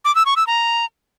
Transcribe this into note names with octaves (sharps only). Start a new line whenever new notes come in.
D6
E6
C#6
E6
A#5